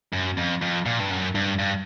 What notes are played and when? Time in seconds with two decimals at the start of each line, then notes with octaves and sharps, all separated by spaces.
0.13 F#2
0.37 F2
0.62 F2
0.86 A#2
1.00 G2
1.11 F#2
1.35 G2
1.59 G2